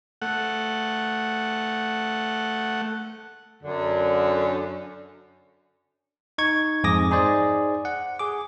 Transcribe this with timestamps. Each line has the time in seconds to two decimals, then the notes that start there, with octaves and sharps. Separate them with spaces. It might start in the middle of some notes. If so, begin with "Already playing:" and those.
0.22 A3 F#5
3.63 F#2 D3
6.38 D#4 C#6 G#6
6.84 F2 G#2 G#4 D6 D#6 A#6
7.11 D#4 G#4 C5 D5
7.85 F#5
8.19 G#4 D6